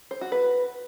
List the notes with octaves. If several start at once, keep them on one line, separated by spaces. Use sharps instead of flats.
C5
F#4
B4